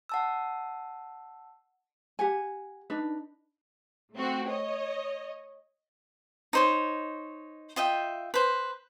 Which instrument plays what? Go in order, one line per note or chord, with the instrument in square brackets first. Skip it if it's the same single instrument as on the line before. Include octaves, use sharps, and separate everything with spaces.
[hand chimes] F#5 A5 E6
[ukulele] G4 F#5 G#5
D4 D#4 B4
[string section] A3 C4 F#4
C#5 D#5
[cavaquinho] D#4 C5 C#5
F4 D#5 E5 G5
B4 C5